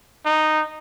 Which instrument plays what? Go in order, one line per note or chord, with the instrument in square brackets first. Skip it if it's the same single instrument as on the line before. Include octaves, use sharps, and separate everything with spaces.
[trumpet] D#4